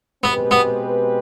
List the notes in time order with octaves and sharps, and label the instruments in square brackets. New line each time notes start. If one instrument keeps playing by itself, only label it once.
[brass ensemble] B2 G#3 C4 G4 B4 [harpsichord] B3
[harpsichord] B3